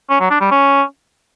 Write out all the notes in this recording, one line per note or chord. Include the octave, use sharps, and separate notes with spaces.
C#4
F#3
D4
G3
C#4